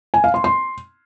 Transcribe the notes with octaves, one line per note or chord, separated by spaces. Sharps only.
G#5
F5
C6
C6